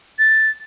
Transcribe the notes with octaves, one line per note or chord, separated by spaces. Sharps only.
A6